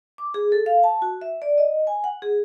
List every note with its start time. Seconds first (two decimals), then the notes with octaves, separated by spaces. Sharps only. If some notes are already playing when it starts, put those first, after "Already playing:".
0.18 D6
0.34 G#4
0.52 A4
0.66 F5
0.84 A5
1.02 F#4
1.22 E5
1.42 D5
1.58 D#5
1.87 G#5
2.04 F#5
2.22 G#4